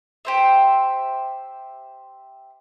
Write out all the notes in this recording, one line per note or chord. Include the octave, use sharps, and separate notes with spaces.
G4 C5 E5